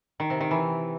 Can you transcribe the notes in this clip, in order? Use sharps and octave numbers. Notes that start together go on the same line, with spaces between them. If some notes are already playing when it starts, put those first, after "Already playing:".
D#3
C3
D#3
E3